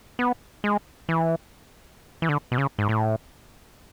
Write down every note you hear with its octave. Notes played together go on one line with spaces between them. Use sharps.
B3
G#3
E3
E3
D3
B2
C#3
G#2
A2